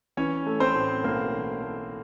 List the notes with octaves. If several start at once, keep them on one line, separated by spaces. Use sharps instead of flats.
E3 C#4 C#5
A3
C4 C5
A2
B1 A#3 A#4
E3
A3